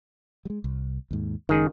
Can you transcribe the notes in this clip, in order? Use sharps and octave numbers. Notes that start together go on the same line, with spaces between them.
G3 G#3
C2
D#2 G#2
F#1 D#3 G#3 C#4 G#4